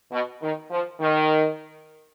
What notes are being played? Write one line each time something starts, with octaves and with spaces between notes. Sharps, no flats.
B2
D#3
F3
D#3